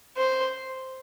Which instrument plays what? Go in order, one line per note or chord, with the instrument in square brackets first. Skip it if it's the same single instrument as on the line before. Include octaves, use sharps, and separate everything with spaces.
[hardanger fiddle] C5